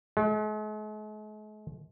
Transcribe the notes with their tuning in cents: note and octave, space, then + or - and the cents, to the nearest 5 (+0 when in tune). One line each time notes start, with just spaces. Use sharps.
G#3 +45